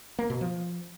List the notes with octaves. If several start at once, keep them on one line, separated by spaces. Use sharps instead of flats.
A#3
B2
F3